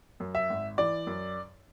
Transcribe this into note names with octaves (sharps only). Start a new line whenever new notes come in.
F#2
E5
G#1
E3 D5
F#2